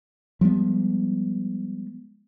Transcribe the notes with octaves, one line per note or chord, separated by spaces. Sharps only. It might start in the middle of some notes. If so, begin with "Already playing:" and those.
F3 G3 G#3 B3